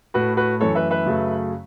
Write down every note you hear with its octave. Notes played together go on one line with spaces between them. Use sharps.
A2 A3 F#4 B4
F#4 B4
F#2 E3 A3 A4 C#5
B4 E5
B4 E5
F#2 C#3 F#3 A3